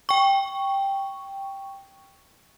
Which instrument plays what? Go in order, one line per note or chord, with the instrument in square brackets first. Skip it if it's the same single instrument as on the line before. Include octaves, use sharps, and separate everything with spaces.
[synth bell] G5 C#6